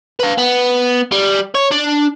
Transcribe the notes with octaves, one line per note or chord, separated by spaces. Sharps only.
B4 F5
B3
G3
C#5
D4